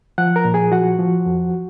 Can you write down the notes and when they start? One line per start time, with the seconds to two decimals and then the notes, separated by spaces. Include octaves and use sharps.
0.18 F3 F#5 F#6
0.36 A#4 A#5
0.45 A#2
0.54 G#4 G#5
0.72 F3 F#4 F#5
0.99 F3
1.26 F2